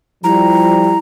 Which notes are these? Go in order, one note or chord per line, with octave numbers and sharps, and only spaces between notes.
F3 G3 E4 A#5